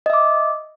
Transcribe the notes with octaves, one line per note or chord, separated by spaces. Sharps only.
D#5 E5 D6